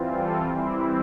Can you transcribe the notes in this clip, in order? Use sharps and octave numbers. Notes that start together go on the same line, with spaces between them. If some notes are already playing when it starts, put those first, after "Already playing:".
Already playing: E3 G3 C4 F4
A4
E3 G3 C4 E4